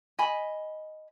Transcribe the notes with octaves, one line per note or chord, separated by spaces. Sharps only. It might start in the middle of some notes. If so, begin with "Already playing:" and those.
D#5 G#5 B5